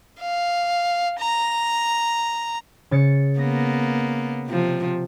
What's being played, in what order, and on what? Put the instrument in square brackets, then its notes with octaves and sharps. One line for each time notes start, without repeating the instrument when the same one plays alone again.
[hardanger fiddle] F5
A#5
[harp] C#3 A6 C#7
[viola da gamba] A#3 B3 [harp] A#6
[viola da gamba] C3 F3